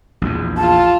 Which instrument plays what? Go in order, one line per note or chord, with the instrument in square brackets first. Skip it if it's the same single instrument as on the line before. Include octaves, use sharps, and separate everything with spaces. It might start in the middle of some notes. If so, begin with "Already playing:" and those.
[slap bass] A#1 E2
[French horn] F4 [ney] A5